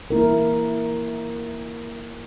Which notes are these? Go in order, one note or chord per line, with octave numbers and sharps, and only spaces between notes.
A#3 E4 A#4